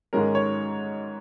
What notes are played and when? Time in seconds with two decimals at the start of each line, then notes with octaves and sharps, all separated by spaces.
0.13 G#2 D#3 G#3 C#4 A#4
0.35 C#5